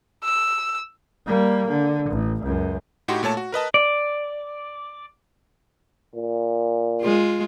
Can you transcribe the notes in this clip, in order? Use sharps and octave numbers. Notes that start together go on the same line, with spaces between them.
E6
G3 A#3
D3
A1
C#2 F#2
A2 D#4 F#4 G4 C6
A#2 A3 C#5 A5
F#4
A#4 B4 D#5 A5
D5
A#2
G#3 F4